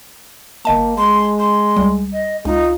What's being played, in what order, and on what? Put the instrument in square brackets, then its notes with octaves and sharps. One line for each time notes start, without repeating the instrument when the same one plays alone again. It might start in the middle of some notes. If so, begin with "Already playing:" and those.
[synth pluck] G1 D#5 A5 [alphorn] A#3
[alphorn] G#3 [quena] C6
[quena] C6
[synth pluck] C#2 G3
[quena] D#5
[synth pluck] C#2 [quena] D#4 [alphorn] F4